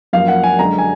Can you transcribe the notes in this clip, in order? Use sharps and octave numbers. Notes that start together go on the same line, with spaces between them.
F#2 F3 A#3 F5
F#5
G#5
F#2 D3 G#3 A#5
G#5